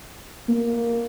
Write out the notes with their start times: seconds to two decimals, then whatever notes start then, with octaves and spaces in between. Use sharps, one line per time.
0.49 A#3